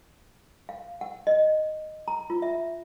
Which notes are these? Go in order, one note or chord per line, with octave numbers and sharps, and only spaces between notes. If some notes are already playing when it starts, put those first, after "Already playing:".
F5
F#5
D#5
A#5
F4
E5